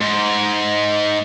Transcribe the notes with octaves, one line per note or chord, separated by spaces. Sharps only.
G#2